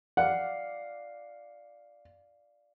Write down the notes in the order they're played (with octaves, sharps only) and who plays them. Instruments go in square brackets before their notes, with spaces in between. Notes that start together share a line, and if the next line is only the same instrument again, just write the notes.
[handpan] D5 F5 [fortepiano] F#5